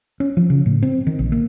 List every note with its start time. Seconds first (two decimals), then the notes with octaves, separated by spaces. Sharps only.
0.20 C#4
0.37 F3
0.50 C#3
0.66 A2
0.83 C4
1.07 D#3
1.19 A#1
1.32 A#3